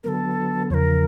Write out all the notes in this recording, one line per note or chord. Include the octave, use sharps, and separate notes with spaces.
D3 F#3 B3 A4 A#4
E2 C#3 F3 A#4 C#5